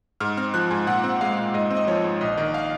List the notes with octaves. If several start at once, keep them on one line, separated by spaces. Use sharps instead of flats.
G#2 F6
C4 F6
F3 F#6
G#2 G#5
A#2 F#5
C4
G#3 F5
A#2
G#2 D#5
C4
D#5
F3 C#5
G#2
A#1 D#5
D#3
F5